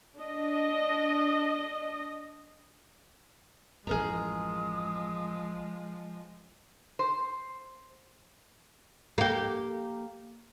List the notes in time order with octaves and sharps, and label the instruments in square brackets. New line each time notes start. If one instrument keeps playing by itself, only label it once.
[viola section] D4 D#5
[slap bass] A1 F#2 [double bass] F3 G#3 [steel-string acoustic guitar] G#4 A#4 A#5 [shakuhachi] D#6
[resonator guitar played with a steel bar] C5
[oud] A#3 G4